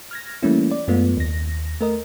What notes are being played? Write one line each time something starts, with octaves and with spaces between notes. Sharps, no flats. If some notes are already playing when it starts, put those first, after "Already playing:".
F6 G#6 A#6
E3 G3 A3 A#3 C#4 E4
D5
F#2 G#3 A3 B3 F4
D#2 A#6
A3 A#4 D#5